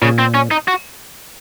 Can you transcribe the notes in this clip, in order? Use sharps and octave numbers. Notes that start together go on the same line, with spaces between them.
A#2 C#3
C4
C#4
D#4
F#4